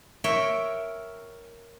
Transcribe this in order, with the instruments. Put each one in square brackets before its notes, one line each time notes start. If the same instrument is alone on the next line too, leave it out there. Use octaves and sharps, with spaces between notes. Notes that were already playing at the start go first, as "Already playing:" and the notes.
[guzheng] A#4 C#5 E5 G5